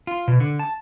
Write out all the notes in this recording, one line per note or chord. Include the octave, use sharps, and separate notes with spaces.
F4
B2
D3
A5